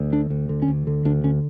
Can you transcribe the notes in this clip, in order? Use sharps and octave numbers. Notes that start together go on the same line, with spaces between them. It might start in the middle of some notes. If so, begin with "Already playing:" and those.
Already playing: D2
D3 D4
D2
D3
C#4
D2
D3
D2 D4
D3 C#4